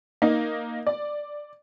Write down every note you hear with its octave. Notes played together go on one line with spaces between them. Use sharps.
A#3 D#4
D5